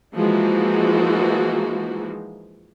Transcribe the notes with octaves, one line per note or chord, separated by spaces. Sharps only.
E3 F3 G#3 A#3 D#4 F#4